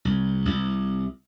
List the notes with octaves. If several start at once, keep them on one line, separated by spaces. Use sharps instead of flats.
C2
C2